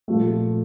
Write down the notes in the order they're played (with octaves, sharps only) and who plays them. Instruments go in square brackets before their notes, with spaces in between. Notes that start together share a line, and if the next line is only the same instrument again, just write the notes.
[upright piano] A#2 F3 A3